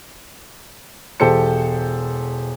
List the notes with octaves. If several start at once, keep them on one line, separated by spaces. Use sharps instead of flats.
E1 G4 A4 C5 C#7